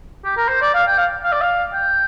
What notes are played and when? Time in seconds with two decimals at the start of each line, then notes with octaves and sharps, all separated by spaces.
0.24 G4
0.37 A#4
0.48 C5
0.61 D5
0.74 F5
0.87 G5
0.98 F5
1.24 F5
1.32 D5
1.41 F5
1.73 G5